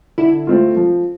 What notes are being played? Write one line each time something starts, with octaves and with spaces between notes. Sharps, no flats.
D3 E4
A3 C4 F4
F3